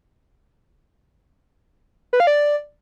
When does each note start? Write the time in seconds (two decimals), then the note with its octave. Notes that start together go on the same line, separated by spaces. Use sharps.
2.13 B4
2.20 F5
2.27 D5